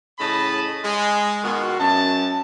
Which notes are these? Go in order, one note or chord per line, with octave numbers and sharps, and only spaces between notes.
A2 C#3 D#5 A5 B5
G#3
B2 D#3 F4 F#4
F#2 A5